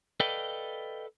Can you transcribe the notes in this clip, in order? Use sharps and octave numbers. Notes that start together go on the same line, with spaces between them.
A4 B4 D5 D#5 F5 G5